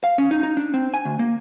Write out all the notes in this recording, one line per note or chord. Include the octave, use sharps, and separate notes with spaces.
F5
C#4
D#4
D#4
D4
C4
G#5
D2
A#3